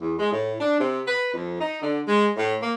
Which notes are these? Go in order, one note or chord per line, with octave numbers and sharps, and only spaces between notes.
E2
G#3
A2
D4
C3
B4
F2
D#4
D3
G#3
A2
A#3